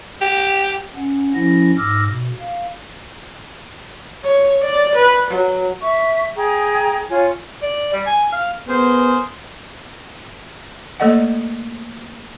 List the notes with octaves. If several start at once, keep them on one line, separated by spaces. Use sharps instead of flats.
G4
C#4 F#5
F3 C#4 E4 A#6
G#2 D6 E6 F6 A#6
B2
F5
C#5
D5
B4
F#3
E5 C#6
G#4 G5 A#5
F4 C#5 G#5
D5
G3
G#5
F5
B3 G#4 A#4 C5
A3 A#3 A4 D5 D#5 F#5